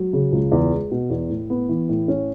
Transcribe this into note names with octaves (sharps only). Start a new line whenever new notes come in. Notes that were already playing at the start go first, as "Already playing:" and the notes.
Already playing: F#3
C#3
C#2
E2
G#3
B2
E2
A2
B3
E3
A2
C#4